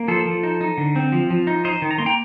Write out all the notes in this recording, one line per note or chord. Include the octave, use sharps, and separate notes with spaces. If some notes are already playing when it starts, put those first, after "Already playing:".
Already playing: A#3
F3 A4 C5
F3
D#4
D#4
D3
C4
F3
F3
D#4
D#4 C5 D#5
D#3
A#5
A#3 C6
G5 A#5